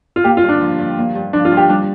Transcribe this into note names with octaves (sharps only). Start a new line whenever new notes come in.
F4
A#3 G4
F4
G2
D4
F3
G2
A#3
G2
F3 D4
F4
G2
G4
G3 D4